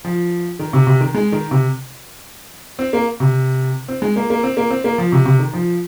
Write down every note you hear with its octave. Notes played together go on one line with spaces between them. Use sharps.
F3
D#3
C3
C3
D#3
G#3
D#3
C3
C4
A#3
C3
C4
G#3
A#3
A#3
C4
A#3
C4
A#3
F3
C3
C3
D#3
F3